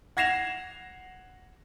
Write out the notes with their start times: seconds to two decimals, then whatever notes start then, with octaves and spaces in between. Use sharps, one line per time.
0.17 F#5 G#6 A#6 C7 E7 F7